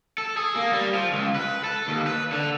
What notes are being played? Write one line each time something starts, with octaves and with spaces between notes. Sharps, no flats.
A4
G#4
A#3
G3
F3
C#2
B4
A4
D#2
B4
D3